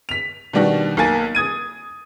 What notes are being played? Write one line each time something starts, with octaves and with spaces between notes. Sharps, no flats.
B6 F7
B2 D#3 G3 D4 F#4
B1 A#3 G#5 A6
D#6 G#6 D#7